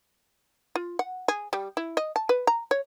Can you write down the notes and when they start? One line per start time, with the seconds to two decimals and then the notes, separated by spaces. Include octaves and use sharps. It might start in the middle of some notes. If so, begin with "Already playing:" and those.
0.75 F4
0.99 F#5
1.28 G#4
1.53 G3
1.77 E4
1.97 D#5
2.16 A5
2.29 B4
2.47 A#5
2.71 C#5